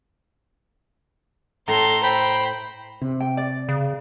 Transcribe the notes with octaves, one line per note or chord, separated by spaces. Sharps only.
A2 A4 A#5 C6
C5 G5 B5
C3
G5
D5
C#3